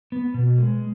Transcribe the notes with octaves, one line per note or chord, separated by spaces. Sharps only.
B3
B2
G#3